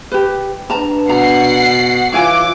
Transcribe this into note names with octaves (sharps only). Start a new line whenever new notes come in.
G4 B4
D4 B4 A5 A#5
B2 F#5 A#5 C7
E3 E4 F4 C#5 G#5 D6